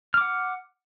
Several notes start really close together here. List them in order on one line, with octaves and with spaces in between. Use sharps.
F6 D6 F#5